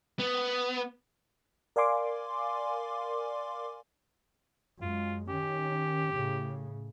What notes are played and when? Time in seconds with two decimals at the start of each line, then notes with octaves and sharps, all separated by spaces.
0.19 B3
1.76 A#4 D5 F5 G#5 C6 D6
4.82 F#2 G#3 F4
5.29 D#3 C#4 G4
6.12 A2 C#3